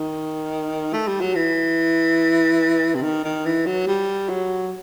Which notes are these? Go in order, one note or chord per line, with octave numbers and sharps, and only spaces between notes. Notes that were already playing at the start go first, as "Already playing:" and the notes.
Already playing: D#3
A3
G3
F#3
E3
C3
D#3
D#3
E3
F#3
G3
F#3